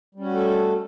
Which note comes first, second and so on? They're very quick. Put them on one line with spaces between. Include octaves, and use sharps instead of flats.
G3 C#4 F#4 A3 A4